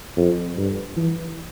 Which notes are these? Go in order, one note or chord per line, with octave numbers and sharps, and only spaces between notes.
F2
G2
E3